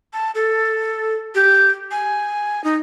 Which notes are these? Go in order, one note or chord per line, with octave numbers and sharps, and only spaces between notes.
A5
A4
G4
G#5
D#4